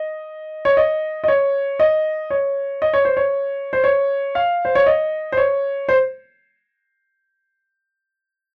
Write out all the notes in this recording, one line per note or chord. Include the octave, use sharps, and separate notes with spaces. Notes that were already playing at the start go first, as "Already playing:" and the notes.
Already playing: D#5
C#5
D#5
D#5
C#5
D#5
C#5
D#5
C#5
C5
C#5
C5
C#5
F5
C5
C#5
D#5
C5
C#5
C5